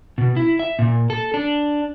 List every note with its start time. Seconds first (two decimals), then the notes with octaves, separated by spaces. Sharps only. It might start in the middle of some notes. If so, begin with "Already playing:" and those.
0.18 B2
0.37 E4
0.59 E5
0.79 A#2
1.10 A4
1.34 D4